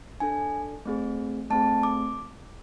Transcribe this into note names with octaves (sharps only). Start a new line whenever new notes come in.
D4 A4 G#5
A3 C4 G#4
A3 C4 G#4 A5
D6